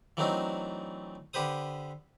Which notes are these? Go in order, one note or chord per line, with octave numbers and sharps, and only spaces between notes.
E3 F#3 A3 C4 D4 D#4
D3 G4 B4 C5 D#6